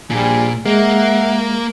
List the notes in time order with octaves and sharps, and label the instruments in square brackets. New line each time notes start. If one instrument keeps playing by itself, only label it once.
[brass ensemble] A#1 G3 G#5 [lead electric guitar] A#2
[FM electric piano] G#3 [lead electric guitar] A#3 [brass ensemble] E5 F#5